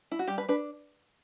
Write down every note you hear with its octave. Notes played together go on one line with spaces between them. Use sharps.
E4
F#4
G3 G4
B4
D4 B4